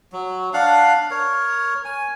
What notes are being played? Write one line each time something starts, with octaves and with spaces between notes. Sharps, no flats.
F#3
D4 F5 F#5
A#4 C#5
G#5